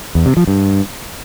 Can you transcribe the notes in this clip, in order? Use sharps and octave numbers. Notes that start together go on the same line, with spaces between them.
E2
C3
F3
G2